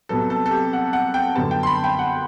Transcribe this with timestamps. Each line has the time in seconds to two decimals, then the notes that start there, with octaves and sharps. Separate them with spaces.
0.09 C2 C3 F#3 B3 A4
0.30 A4
0.46 A4
0.51 G4
0.73 F#5
0.93 F#5
1.14 G5
1.36 F#2 D3 G3 B3 A5
1.51 G5
1.63 C6
1.67 B5
1.84 G5
1.99 F#5